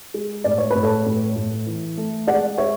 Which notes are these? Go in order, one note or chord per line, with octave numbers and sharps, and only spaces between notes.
G#3
A2 D5
C#5
A2 B4
A4 C#5
A2
A2
E3
A3
G#3 D5 F#5
G#3 C#5 E5